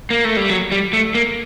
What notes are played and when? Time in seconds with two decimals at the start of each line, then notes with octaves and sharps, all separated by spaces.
0.10 A#3
0.25 A3
0.37 G3
0.50 F#3
0.72 G3
0.93 A3
1.15 A#3